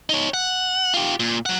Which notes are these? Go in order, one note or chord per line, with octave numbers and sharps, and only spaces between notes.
D#4 C#5
F#5
F4 G4
A#2
F#3 F#5